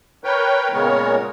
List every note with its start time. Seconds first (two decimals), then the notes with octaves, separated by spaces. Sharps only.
0.24 A#4 B4 C#5 G5
0.73 A#2 C#3 G#3 B3 A#4 C#5